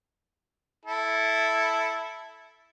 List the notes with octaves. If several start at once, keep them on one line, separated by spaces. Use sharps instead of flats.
E4 A4